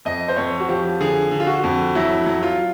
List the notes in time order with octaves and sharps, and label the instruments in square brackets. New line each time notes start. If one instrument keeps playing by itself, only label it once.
[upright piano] F2 [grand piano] D#5
[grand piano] C5
[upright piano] F2 [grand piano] C#5
[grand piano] F#4
[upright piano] F3 [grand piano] G4
[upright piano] D3 [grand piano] G#4
[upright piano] D3
[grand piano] F4
F#4
[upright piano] F2
[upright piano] F#3 [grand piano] E4
[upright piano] F#3
[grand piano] F4